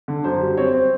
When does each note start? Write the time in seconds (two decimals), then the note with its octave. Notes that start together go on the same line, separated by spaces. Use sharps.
0.08 D3
0.24 F#2 C5
0.41 G3
0.57 C4 C#5
0.73 C4